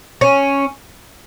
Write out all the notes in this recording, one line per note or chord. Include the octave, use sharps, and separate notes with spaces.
C#4